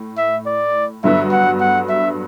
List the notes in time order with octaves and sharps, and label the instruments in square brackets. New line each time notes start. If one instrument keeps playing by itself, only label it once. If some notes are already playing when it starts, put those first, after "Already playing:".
Already playing: [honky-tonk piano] A2
[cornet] E5
D5
[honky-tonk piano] G2 D3 F#3 B3 F#4 [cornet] E5
[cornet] F#5
F#5
E5